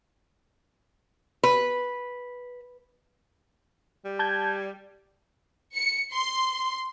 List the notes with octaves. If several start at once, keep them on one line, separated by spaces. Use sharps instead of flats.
B4
G3
A5 G6 G#6
C#7
C6